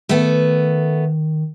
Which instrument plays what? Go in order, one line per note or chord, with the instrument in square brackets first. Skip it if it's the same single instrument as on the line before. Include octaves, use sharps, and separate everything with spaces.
[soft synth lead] D#3 [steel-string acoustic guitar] A3 B3